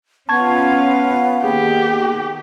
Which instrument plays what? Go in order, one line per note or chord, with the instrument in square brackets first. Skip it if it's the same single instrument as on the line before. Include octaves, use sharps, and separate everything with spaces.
[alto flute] B3 [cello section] C#4 F4 F5 [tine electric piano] A5 C#6 G#6
[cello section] D#3 [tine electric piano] A#3 G#4 [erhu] G4